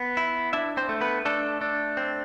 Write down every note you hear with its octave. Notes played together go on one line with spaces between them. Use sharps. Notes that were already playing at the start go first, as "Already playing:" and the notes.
Already playing: B3
E4
D4 E4 E5
C4 C5
A3
B3 B4
A3 D4 A4
D4
C4